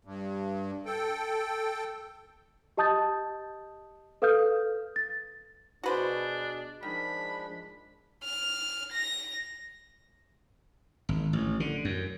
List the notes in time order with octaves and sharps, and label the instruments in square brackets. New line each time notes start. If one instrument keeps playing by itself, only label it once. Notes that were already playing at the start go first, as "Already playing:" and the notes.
[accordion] G2
A4 G5
[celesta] G4 D#5 A5 D#6 G6 A6
A4 B4 F5 D#6 F6 G6
A6
[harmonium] B2 G#4 [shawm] D4 [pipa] F#4 B4 C5
[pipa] D#3 [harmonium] F3 G#3 D4 [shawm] B5
[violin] F6
A#6
[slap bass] G#1
A1
D3
F#2